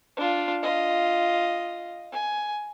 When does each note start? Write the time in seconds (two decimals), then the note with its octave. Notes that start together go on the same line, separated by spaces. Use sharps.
0.17 D4 F4
0.63 F4 D#5
2.12 G#5